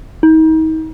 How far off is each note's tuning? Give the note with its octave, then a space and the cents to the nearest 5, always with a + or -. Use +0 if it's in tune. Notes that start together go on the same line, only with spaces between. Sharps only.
D#4 +35